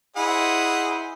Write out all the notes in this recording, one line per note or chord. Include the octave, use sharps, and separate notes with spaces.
E4 G#4 C5 D#5 F#5